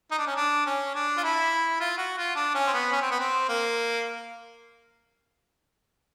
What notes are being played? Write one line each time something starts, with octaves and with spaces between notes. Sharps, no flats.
D#4
D4
C#4
D4
C#4
D4
F4
E4
F4
F#4
F4
D4
C#4
C4
B3
C#4
C4
B3
C4
A#3